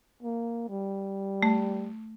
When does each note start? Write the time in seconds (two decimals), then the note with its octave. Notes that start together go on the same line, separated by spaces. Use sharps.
0.23 A#3
0.69 G3
1.43 A3